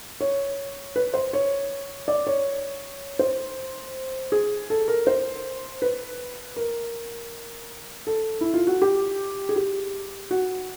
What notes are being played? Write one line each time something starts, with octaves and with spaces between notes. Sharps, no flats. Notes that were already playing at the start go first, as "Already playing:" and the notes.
C#5
B4
C5
C#5
D5
C#5
C5
G#4
A4
A#4
C5
B4
A#4
A4
E4
F4
F#4
G4
G#4
G4
F#4